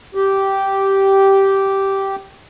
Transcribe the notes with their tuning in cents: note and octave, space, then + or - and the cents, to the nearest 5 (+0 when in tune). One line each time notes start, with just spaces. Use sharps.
G4 -10